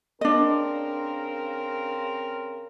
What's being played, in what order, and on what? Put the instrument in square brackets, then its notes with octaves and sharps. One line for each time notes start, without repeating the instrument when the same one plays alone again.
[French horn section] C#3 C4 A#4 [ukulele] D4 D#5